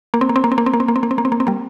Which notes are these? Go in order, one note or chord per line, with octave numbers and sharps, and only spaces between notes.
A#3
C4
A#3
C4
A#3
C4
A#3
C4
A#3
C4
A#3
C4
A#3
C4
A#3
C4
A#3
C4
G3 A#3